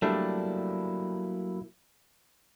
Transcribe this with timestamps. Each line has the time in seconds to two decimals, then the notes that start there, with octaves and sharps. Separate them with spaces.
0.02 F#3 G3 A3 A#3 D4 E4